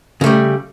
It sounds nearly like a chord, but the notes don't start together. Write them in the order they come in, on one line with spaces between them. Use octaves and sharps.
C#3 A3 G3